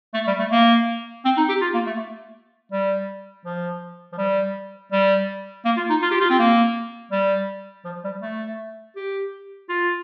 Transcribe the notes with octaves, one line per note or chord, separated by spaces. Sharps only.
A3
G3
A3
A#3
C4
D#4
G4
F4
A#3
A3
G3
F3
F3
G3
G3
A#3
F4
D#4
F4
G4
F4
C4
A#3
G3
F3
G3
A3
G4
F4